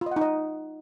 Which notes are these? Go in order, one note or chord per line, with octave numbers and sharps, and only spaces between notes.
F4
D#5
F#5
D#4
D#5